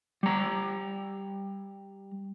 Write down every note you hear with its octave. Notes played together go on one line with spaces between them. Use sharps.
G3 A#5